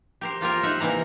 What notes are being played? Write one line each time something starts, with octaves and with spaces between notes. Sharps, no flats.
G4 A#4 C5
A#3 F4 G4 A#4
D#4 E5 F#5
C3 E3 A#3 A#5